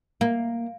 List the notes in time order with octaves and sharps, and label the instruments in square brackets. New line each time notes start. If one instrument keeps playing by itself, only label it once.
[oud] A#3